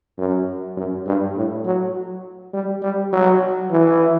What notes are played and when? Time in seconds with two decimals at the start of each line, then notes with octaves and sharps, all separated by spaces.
0.18 F#2
0.77 F#2
1.06 G2
1.36 A2
1.65 F#3
2.53 G3
2.82 G3
3.12 F#3
3.71 E3